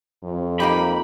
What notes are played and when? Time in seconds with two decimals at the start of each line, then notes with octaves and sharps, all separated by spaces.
0.23 F2
0.60 A#3 D#4 G4 B5